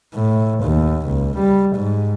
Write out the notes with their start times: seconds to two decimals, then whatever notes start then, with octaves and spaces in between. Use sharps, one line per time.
0.14 A2
0.64 D#2
1.08 C#2
1.38 G3
1.77 G#2